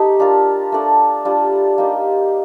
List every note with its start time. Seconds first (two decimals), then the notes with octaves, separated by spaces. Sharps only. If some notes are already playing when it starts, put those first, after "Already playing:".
Already playing: A3 D#4 G4
0.20 D4 F4 A#4
0.72 A3 D4 A4 D5
1.25 G3 D4 F4
1.78 A#3 D#4 G4